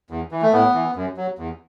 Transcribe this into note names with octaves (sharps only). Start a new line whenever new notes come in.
E2
E3
A3
A2 B3
E3
F#2
F#3
E2